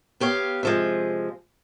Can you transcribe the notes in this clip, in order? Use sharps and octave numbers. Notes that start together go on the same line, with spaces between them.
B3 G4 C#5 F5
C3 F3 G#3